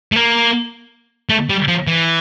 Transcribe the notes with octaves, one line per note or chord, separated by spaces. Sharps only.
A3
A#3
A3
G3
F3
E3